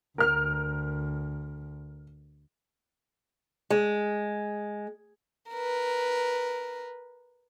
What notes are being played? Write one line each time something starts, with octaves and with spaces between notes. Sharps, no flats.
D2 A#4 F6
G#3
A#4 B4